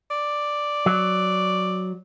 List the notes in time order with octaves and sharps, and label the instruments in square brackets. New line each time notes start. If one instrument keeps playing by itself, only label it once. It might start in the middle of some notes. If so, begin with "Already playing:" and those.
[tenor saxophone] D5
[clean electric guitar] F#3